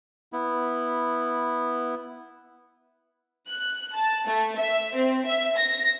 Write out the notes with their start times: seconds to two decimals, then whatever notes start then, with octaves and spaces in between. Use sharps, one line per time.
0.33 B3 E4
3.48 F#6
3.95 A5
4.27 A3
4.58 E5
4.95 C4
5.26 E5
5.57 A#6